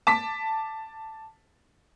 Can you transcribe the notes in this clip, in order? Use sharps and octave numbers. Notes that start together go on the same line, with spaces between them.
A5 D6 B6